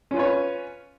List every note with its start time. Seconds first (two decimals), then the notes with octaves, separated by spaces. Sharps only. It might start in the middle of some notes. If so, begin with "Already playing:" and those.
0.11 C#4
0.14 F4
0.17 B4
0.19 C#5